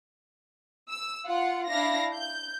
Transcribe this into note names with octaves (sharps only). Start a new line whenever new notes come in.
E6
F4 F#5
D4 E4 F5 A#6
G6